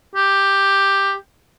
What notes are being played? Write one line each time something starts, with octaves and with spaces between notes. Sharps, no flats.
G4